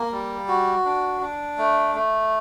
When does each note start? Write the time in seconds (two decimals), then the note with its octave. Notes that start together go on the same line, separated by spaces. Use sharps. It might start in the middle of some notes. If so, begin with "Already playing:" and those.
Already playing: A#3
0.12 G3
0.48 F#4
0.85 D4
1.21 D4
1.58 A3
1.95 A3